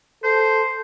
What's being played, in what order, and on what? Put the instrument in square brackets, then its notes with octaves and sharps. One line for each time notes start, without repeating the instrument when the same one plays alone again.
[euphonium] A4 [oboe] C5